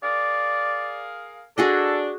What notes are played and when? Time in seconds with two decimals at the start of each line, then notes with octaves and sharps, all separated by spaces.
0.03 G#4 A#4 D5 F5
1.58 D4 F#4 G#4 A4 D#5